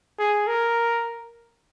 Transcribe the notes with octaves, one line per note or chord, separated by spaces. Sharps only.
G#4
A#4